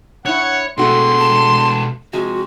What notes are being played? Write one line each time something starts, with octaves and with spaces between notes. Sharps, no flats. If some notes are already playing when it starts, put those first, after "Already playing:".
G2 E4 C#5 F#5
B2 G#3 A3 F#4 A4 C6
A5
C3 F3 G#3 F#4